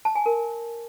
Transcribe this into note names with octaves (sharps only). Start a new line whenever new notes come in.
A5
G#5
A#4